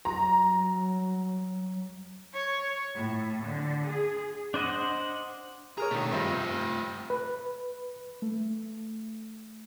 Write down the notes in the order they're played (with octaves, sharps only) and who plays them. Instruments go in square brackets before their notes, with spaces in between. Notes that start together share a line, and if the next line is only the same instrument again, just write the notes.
[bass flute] F#3 [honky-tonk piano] A#5
[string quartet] C#5
A2
D3
G#4
[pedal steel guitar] D4 C5 D#5 F#5
[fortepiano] G#4 A#4 C#5 [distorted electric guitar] A#5
[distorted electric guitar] B1 D4 [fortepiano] D#3 A3
[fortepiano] G2 C3 F3 [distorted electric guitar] A3 F4
[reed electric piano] B4
[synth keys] A3